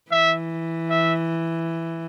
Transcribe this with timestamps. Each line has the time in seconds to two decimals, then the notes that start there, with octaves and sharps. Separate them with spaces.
0.11 E3 E5
0.90 E5